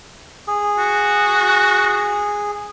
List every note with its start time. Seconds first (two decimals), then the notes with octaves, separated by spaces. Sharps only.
0.48 G#4
0.78 F#4